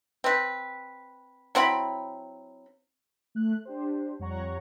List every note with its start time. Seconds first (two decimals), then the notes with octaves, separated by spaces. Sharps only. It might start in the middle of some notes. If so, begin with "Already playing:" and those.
0.24 C4 B4
1.55 F#3 C4 E4 B5
3.35 A3 F#6
3.65 D4 G4 C5
4.19 F2 G3 C#5 F#5 A#5 C#6